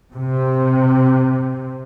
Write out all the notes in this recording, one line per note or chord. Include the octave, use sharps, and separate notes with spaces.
C3